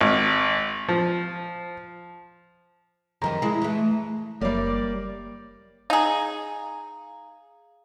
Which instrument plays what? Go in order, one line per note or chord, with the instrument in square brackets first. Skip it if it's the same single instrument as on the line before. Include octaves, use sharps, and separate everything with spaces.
[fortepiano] G#1
F3
[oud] F2 D#3 G3 [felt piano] A#5
[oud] G#3 E4
E3 A3
[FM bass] F#1 [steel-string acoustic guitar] G3 A#3 [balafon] C#5 E5 [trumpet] D5
[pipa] D#4 G#4 [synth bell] F5 A#5